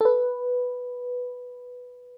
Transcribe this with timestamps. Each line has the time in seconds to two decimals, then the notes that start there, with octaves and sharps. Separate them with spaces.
0.01 A4
0.05 B4